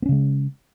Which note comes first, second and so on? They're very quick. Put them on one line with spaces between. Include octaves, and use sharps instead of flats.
B3 C#4 C#3 G#3